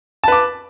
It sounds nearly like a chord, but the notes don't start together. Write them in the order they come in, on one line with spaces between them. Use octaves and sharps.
A5 B4 D6